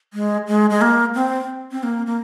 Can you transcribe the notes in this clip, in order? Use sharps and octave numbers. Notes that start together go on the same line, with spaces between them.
G#3
G#3
G#3
A#3
C4
C4
A#3
A#3